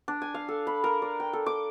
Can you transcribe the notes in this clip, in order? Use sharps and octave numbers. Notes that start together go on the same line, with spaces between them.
D4
G#5
F5
A4
B5
A#4
D5
G5
A4
D6